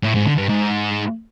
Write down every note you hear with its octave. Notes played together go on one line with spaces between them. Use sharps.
A2
G#2
D3
G2
G#2